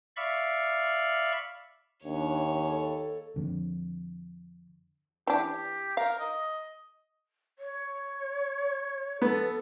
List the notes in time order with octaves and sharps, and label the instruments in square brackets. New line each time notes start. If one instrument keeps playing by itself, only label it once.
[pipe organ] D5 E5 F5 B5 C#6 F6
[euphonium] D#2 [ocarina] D4 [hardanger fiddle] C#5
[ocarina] A4
[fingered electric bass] F2 D3
[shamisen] E3 D4 [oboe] G4
[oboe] A#4 [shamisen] F5
[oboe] D#5
[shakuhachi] C#5
[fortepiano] B3 [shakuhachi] A4